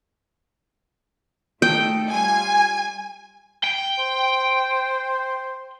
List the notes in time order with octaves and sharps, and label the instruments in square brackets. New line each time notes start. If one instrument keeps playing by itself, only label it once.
[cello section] A3 D#4 A4 [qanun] G5
[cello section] G3 F4 [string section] G#5
[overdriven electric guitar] G5
[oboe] C5